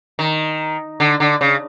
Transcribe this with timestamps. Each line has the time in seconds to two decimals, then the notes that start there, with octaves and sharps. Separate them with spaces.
0.19 D#3
1.00 D3
1.20 D3
1.41 C#3